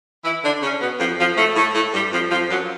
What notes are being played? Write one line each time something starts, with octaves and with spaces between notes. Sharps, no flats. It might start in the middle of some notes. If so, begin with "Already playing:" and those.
E3 E4
D3 D4
C#3 C#4
B2 B3
F2 F3
F2 F3
A2 A3
A2 A3
A2 A3
G2 G3
F2 F3
F2 F3
F#2 F#3